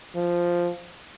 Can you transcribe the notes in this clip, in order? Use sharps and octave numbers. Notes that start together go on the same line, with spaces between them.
F3